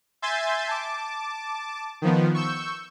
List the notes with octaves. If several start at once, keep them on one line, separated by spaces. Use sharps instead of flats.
E5 G#5 C6 G6 A6
A5 D6
D#3 F3 B3
C#6 E6 G6